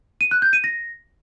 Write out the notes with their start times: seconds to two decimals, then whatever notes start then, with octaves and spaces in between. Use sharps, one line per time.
0.21 D#7
0.31 F#6
0.42 G6
0.53 D#7
0.64 A#6